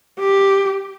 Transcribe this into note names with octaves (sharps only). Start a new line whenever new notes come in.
G4